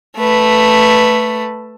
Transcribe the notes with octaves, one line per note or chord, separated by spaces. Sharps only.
A3 B4